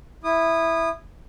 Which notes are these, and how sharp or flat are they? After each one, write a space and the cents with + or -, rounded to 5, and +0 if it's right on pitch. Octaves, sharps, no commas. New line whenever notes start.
E4 +0 D#6 -20